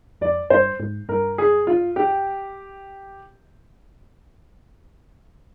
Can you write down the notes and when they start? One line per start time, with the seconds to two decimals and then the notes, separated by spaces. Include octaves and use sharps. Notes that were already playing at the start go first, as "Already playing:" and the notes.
0.21 F2 D5
0.50 G2 C5
0.80 G#2
1.09 G2 A#4
1.38 G#4
1.67 F4
1.96 G4